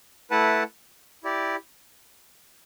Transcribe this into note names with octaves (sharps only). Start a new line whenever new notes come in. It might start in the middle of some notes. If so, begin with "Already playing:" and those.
A3 E4 B4 F#5 A5
E4 G4 D5